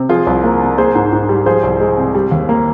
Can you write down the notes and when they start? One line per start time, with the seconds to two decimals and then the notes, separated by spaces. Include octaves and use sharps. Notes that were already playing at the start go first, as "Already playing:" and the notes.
Already playing: C3
0.09 F3 F4 G#4
0.27 C2
0.44 A#3
0.61 C3
0.78 A#3 G#4 C5
0.95 G#2
1.13 G#2
1.29 G3
1.46 F3 G#4 C5
1.63 C2
1.80 G#3
1.97 C3
2.15 G3
2.31 D#2
2.49 A#3